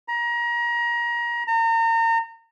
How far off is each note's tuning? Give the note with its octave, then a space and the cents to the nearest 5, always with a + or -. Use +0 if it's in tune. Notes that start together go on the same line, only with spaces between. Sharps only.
A#5 +30
A#5 -35